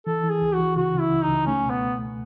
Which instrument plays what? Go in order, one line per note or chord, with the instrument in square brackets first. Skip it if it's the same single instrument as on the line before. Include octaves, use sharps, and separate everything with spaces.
[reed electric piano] E3 [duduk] A4
[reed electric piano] E3
[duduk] G#4
[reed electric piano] C#2
[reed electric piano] E3 [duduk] F#4
[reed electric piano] C#3 [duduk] F#4
[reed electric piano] C#3
[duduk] E4
[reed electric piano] C#2
[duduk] D#4
[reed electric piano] C#2
[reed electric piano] A3 [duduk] C#4
[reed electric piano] B2
[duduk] B3
[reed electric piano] C#2
A3